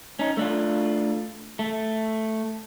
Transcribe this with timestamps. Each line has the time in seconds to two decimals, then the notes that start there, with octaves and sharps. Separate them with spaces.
0.19 C#4 D#4
0.37 A3 D4 F4
1.59 A3